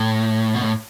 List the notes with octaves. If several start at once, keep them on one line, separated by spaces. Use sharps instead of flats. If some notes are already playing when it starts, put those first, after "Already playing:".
Already playing: A2
B2
A2